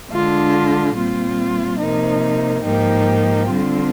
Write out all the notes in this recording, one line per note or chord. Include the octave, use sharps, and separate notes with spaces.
D3 G#3 D4 F4
A#2 G3 C4 F4
C3 F3 A#3 D#4
G#2 F3 A#3 D#4 G4
D3 G3 C4 F4